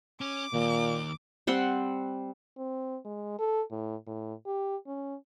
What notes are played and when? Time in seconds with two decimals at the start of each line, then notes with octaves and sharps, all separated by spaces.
0.21 C#4 D6
0.54 D#2 A#2
1.47 G3 C4 F#5 C6
2.57 C4
3.05 G#3
3.39 A4
3.71 A2
4.07 A2
4.46 G4
4.87 C#4